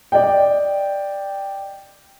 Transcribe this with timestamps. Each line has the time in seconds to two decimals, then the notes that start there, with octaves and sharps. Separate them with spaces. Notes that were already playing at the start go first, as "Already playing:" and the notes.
0.12 D5 D#5 G5